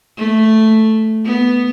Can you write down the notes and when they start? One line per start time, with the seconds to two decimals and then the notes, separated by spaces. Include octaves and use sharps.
0.18 A3
1.25 B3